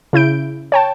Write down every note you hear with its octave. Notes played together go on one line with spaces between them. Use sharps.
C#3 E4 G6 D7
C#5 G5 A5